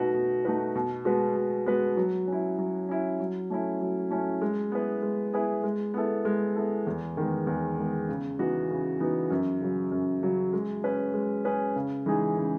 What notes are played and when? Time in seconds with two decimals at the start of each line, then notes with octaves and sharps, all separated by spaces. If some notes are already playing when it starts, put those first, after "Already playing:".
Already playing: B2 A3 D#4 F#4 B4
0.14 B2
0.45 A3 D#4 F#4 B4
0.75 B2
1.05 G#3 B3 F#4 B4
1.36 B2
1.66 G#3 B3 F#4 B4
1.97 F#3
2.27 C#4 E4
2.58 F#3
2.89 C#4 E4
3.20 F#3
3.50 A3 C#4 E4
3.81 F#3
4.10 A3 C#4 E4
4.42 G#3
4.72 B3 E4 G#4 B4
5.02 G#3
5.33 B3 E4 G#4 B4
5.63 G#3
5.94 B3 E4 A4
6.25 G#3
6.56 B3 E4 A4
6.87 E2
7.17 D#3 G#3 B3
7.47 E2
7.78 D#3 G#3 B3
8.09 C#3
8.39 E3 B3 D#4 F#4
8.70 C#3
9.00 E3 B3 D#4 F#4
9.30 F#2
9.61 C#3 F#3
9.92 F#2
10.22 C#3 F#3
10.53 G#3
10.83 C#4 G#4 B4
11.14 G#3
11.45 C#4 G#4 B4
11.76 C#3
12.06 E3 G#3 D#4 G#4
12.37 C#3